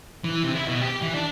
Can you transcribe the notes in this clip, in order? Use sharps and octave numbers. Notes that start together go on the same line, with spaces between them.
E3
C3
E4
B2
G4
E3
D4